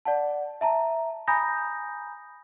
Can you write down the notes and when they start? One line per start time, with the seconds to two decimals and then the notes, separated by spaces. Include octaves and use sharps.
0.05 D5 F#5 A5
0.61 E5 A5 A#5
1.28 G#5 A#5 B5 D#6 G6 A#6